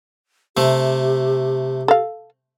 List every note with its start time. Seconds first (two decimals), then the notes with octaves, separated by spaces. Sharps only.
0.57 C3 A3 G4
1.88 A4 F5